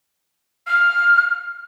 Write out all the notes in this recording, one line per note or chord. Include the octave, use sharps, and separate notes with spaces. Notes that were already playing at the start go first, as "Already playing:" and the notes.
F6